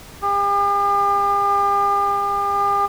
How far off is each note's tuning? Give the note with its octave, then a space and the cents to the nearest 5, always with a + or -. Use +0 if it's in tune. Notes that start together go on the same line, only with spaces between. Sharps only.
G4 +45